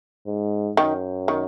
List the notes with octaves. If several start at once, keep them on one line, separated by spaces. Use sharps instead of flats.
G#2
F#2 D#3
D#3